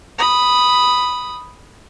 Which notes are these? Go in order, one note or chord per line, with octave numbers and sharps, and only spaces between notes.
B5 D#6